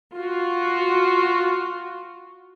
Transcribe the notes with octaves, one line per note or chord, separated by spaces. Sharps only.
F4 F#4